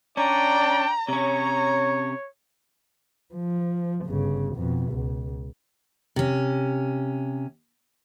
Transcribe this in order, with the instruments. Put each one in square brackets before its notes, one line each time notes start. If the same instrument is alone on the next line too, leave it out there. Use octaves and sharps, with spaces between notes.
[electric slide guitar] C#4 [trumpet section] D4 D5 G5 [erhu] A#5
[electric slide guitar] C3 C#4 [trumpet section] C#5 [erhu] A#5
[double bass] F3
G1 C#3
F2 B2
C#2
[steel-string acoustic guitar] C3 C#4